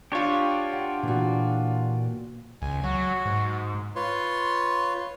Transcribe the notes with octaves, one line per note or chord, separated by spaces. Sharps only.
D4 F4 G4 C#5
F#5
A#2 E3 F#4
C#2 G#5
F#3 F#4
G#2
F4 B4 C#5 C6